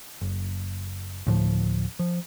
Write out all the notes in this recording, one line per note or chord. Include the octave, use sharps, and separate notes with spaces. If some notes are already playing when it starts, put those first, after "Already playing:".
F#1
D2 A2 F3
F3